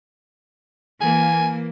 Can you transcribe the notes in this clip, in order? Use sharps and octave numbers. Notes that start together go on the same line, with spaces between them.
E3 A#3 G#5